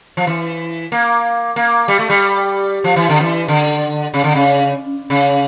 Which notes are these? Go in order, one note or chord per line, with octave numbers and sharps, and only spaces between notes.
F3
E3
A#3
A#3
G3
A3
G3
F3
E3
D3
E3
D3
C#3
D3
C#3
C#3